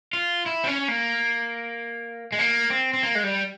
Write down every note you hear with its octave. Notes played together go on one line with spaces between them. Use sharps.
F4
E4
C4
C#4
A#3
G#3
A#3
C4
C4
A#3
G#3
G3